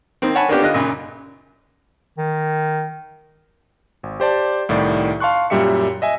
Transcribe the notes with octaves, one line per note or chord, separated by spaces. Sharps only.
D#3 A#3 C4
C#5 F#5 G#5 A5 B5 C#6
A#3 B3 C#4 D4 F4 G4
D3 F4 D#5 F#6
F#2 A#2 C#3
D#3
G#1
G4 C5 D5 A5
C2 A2 D#3 D5
F5 A5 C6 C#6 F#6
F#2 A#2 G3 G4 E5 C#7
D#5 E5 G#5